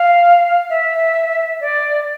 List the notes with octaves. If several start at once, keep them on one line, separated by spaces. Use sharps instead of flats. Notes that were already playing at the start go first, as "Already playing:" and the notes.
Already playing: F5
E5
D5